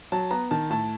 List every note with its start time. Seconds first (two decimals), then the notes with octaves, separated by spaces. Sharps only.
0.12 F#3 A5
0.31 B3 A#5
0.51 D#3 A5
0.70 A2 A5